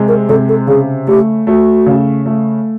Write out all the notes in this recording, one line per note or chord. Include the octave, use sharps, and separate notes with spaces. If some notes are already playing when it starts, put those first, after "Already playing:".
Already playing: C3 G#3
A#4
C3 A4
A4
C#3 G#4
A3 G4
A3 F#4
C#3
A3